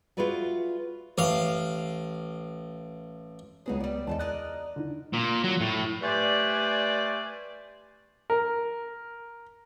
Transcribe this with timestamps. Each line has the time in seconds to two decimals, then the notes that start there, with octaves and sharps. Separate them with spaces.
0.17 F4 F#4 G#4 B4 D5 E5
1.18 A1 F5
3.66 C#2 B3 D#4 F#4 G#4 C#5
3.80 G3 D5
4.07 E2 A4 C5 D#5 A5
4.19 A#4 D5 D#5 F#6
4.76 D3 D#4
5.13 A#2
5.44 F#3
5.61 A2
6.02 G3 A3 B4 C5 D5 G#5
8.30 A#4